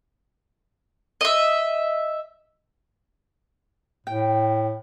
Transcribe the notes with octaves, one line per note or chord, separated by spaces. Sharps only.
D#5 E5
A2 G5